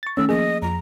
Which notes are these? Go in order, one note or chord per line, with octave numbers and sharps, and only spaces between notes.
C#6 A6
D#3 A3 C#4 E6
F3 A#3 G#4 D#5
F2 F3 A#5